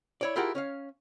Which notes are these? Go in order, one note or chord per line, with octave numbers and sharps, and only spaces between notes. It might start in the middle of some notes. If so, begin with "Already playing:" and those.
E4 C#5 D5
E4 F4 G4 G#4 A#4 F#5
C#4 C#5 F5